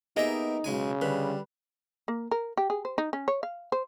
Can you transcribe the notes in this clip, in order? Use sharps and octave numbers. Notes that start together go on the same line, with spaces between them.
A#3 B3 D#4 G4 G#4 D#5 E5
B1 C#3 G#3 G#5
D3 G3 B4
A#3
A#4
G4
G#4
C5
D#4
C#4
C#5
F5
C5